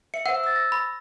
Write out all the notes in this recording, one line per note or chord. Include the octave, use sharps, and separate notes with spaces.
E5 C#7
C5 F#5 E6
E6 A6
A#6
B5